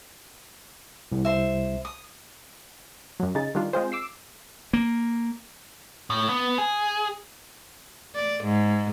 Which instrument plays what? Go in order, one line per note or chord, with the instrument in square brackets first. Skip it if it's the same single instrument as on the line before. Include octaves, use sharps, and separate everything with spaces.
[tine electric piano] C2
[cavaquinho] C5 E5
D#6
[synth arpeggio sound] F#2 F#3
C#3 D#4 G#4 A6
D#3 G3 D4 F4
G#3 C4 F4 G#4 C5
D6 E6 C7
[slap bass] A#3
[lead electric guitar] A2
B3
G#4
[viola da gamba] D5
G#2